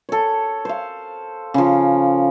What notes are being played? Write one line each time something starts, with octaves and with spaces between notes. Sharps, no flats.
A4 C#5
C5 F5
C#3 F3